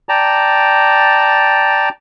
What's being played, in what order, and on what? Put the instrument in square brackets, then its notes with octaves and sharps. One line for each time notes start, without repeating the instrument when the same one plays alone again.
[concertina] D5 G5 A5 A#5